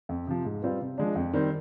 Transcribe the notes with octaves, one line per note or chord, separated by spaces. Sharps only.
F2
C3 F3
G#2
G3 C4 F4 B4
C3
F3 G#3 D4
F2
D#3 G3 C4